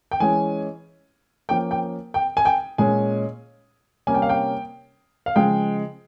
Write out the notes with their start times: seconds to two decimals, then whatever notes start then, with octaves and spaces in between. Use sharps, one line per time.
0.11 G5
0.20 E3 G#3 C#4 G#5
1.49 F3 A#3 C#4 G5
1.71 G5
2.14 G5
2.37 G#5
2.45 G5
2.78 A#2 G#3 C#4 G#5
4.07 C3 G3 A#3 C#4 G#5
4.14 G5
4.22 F5
4.29 G5
5.26 F5
5.36 C#3 F3 G#3 G5